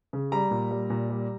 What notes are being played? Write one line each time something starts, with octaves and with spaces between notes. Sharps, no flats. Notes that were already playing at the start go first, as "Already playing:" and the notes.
C#3
G3 A#5
A#2
G3
A#2
G3